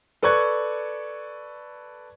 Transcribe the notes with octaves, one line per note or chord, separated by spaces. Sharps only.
A4 B4 D5 C#6 F#6 G#6